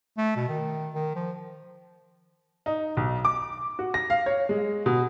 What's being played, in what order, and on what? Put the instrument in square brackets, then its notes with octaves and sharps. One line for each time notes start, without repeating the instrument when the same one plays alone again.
[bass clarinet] A3
B2
D#3
D#3
F3
[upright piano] D#4
B1
D6
F#4
A#6
F5
C#5
G#3
B2